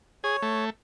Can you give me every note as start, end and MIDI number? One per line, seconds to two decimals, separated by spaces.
0.24 0.37 68
0.24 0.65 73
0.42 0.70 57